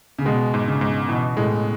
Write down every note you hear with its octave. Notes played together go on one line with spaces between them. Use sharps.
C#3
B2 G#3
G#2
C#3
G#2
B2 E3
A2 G#3